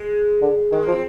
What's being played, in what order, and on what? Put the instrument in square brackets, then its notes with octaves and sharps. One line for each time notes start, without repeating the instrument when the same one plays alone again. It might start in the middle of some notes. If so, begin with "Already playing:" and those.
Already playing: [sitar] G#3
[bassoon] D3
[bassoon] D#3 [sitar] G#3
[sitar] A#3
[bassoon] F3
[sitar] C4